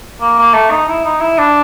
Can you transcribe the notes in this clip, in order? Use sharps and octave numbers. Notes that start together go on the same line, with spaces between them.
A#3
A#3
A3
D#4
E4
D#4
E4
D4